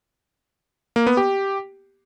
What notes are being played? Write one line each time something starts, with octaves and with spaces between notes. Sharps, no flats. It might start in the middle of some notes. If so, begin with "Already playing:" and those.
A#3
B3
G4